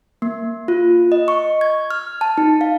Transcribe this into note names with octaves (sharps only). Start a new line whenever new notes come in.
A#3
F4
D#5
C#6
G#6
F6
A5
D#4
F5